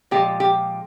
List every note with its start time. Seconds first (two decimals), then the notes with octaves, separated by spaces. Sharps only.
0.11 A#2 F3 G#3 G4
0.40 G4